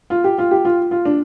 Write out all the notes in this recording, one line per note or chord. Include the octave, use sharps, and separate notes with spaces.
F4
G4
F4
G4
F4
F4
D4